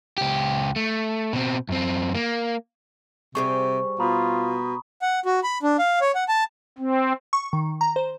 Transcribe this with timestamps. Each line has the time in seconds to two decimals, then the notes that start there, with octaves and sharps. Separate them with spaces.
0.18 C#2 G4
0.76 A3
1.33 B2 C4
1.69 F#2 C4
2.15 A#3
3.35 C3 G3 G#4 C5 C#6
4.00 B2 F4 A#5 B5 D#6
5.02 F#5
5.25 F#4
5.44 B5
5.63 D4
5.79 F5
6.01 C#5
6.15 F#5
6.29 A5
6.78 C4
7.33 C#6
7.53 D#3
7.81 A#5
7.96 C5